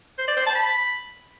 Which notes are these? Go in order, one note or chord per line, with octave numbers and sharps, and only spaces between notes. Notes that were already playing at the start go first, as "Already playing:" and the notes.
C5
D5
C5
A5
B5